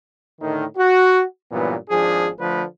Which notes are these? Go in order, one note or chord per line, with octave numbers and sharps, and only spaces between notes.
A2 D3 D#3
F#4
G2 A#2 E3 F#3 B3
G#1 F3 D4 G#4
D3 F3 A3 B4